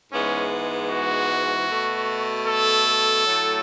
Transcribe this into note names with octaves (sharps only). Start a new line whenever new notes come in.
G#2 E3 G#3 B3 C#4
F#4
B2 A3
A4
A2 F#3 A3